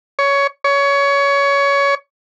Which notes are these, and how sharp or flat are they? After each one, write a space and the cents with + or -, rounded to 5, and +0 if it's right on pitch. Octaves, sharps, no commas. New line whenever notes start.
C#5 +15
C#5 +20